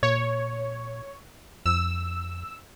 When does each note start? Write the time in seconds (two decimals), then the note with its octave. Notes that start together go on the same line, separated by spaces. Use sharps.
0.03 A#2 C#5
1.66 F2 E6